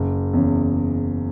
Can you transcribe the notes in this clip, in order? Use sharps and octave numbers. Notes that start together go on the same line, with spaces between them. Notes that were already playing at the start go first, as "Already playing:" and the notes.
Already playing: F#1
E2 C#3